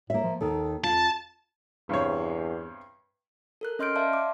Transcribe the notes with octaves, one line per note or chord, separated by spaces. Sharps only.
A2 A#3 E5
F3
D#2 D#3 A4
F2 F4 A5
E2 G2 C3 C#5
A4 A#4 F#6
C#4 D#5 C6 F6 G6 D7
D5 E5 F5 A5 C6
D6